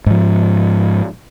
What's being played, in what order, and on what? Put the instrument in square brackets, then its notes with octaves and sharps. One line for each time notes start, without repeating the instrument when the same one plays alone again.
[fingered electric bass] G#2 F3